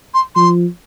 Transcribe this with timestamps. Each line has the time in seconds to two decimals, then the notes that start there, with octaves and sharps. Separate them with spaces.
0.14 C6
0.35 F3 C6